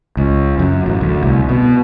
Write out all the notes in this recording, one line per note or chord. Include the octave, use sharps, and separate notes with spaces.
C#2
F#2
A1
D2
C2
B2